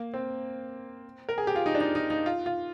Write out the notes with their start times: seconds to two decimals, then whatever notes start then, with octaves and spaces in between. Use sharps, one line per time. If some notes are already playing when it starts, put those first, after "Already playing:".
Already playing: A#3
0.14 C4
1.29 A#4
1.38 G#4
1.47 G4
1.56 F4
1.66 D#4
1.75 D4
1.81 D#4
1.95 D#4
2.10 D#4
2.26 F4
2.46 F4